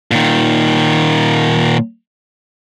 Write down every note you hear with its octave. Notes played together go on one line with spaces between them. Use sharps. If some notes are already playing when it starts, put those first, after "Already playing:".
A#2 D#3